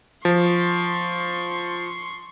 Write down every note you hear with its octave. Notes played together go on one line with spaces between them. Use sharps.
F3 C6 C#6